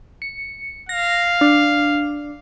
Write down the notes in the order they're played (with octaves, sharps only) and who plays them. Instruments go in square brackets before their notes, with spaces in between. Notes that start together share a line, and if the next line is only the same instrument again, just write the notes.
[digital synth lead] C#7
[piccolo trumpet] F5 [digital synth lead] A#6
[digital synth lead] D4